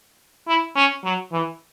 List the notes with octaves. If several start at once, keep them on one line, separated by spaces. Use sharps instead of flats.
E4
C#4
F#3
E3